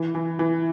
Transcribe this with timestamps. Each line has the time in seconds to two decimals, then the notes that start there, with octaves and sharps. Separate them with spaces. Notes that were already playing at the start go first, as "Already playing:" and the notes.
Already playing: E3
0.15 E3
0.39 E3